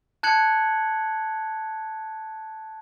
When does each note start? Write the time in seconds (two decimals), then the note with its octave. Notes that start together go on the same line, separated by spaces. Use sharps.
0.23 A5 F#6 G#6 C#7 F#7